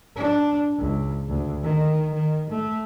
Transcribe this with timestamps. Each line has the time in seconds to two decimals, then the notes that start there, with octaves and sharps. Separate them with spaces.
0.16 D4
0.79 C#2
1.28 D2
1.63 D#3
2.14 D#3
2.50 A3